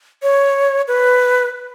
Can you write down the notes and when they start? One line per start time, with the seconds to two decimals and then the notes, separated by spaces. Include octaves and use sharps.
0.23 C#5
0.87 B4